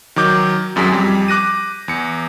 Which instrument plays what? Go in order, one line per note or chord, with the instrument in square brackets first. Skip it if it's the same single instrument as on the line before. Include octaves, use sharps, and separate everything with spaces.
[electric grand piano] D#3 F#3 D6 G6
G#1 F#2 F#3 G#4 B6
F2 G3
D6 F#6 A#6 D#7
E2 C#7